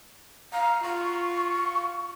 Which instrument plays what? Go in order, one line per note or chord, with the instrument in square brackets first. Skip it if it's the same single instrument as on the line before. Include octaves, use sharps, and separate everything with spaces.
[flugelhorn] F5 [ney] A#5
[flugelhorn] F4 [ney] C#6